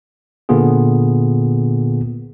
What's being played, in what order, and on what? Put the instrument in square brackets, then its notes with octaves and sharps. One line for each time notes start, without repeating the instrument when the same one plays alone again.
[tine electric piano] A#2 D3 A#3 B3 F4 G#4